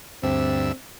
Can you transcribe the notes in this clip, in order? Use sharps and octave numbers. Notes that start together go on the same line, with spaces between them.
D2 G2 C4 E5